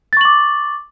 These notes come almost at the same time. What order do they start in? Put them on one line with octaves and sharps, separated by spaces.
A6 C#6 F#7 D6